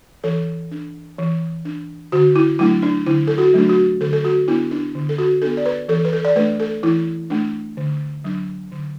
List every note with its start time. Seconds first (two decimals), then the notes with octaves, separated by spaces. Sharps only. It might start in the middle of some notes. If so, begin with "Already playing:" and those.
0.24 E3 A4
0.71 D4
1.18 E3
1.65 D4
2.12 D3 F#4
2.36 E4
2.59 F#3 A3 D4 E4
2.82 D4
3.06 D3 E4
3.27 A4
3.38 F#4
3.54 F#3 A3 D4
3.70 F#4
4.01 D3 A4
4.13 A4
4.25 F#4
4.48 B3 D4 E4
4.71 D4
4.95 D3
5.09 A4
5.18 F#4
5.42 B3 D4 A4
5.57 D5
5.66 B4
5.89 E3 A4
6.05 B4
6.13 A4
6.25 D5
6.36 A3 D4 B4
6.60 A4
6.83 E3 E4
7.30 A3 D4
7.77 D3
8.24 F#3 D4
8.71 D3